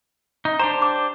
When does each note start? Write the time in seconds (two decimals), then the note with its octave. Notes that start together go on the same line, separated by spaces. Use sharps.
0.45 D#4
0.59 D4 G4 C5 A#5
0.82 D6